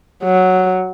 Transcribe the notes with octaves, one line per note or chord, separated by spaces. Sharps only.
F#3